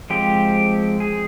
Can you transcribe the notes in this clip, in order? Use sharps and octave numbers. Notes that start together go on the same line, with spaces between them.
F3 G#3 C4 G4
G#4